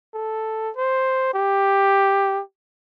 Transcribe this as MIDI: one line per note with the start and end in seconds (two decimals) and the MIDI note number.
0.14 0.70 69
0.77 1.32 72
1.34 2.41 67